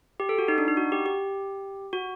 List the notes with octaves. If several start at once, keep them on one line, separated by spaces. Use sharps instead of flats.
G4
A4
F#4
D#4
D4
D#4
F#4
G4
G4
F#4